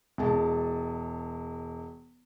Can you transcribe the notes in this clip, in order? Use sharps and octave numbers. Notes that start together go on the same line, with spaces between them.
E1 G#3 A5